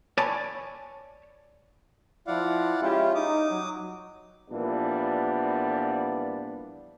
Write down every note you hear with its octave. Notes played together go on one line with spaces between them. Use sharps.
C#5 D5 G#5 A5 B5
F3 E4 D5 F5 F#5
G#3 C#4 E4 F4 G4
D#4 D6 D#6
F#3
A#2 E3 F3 G3 B3 D4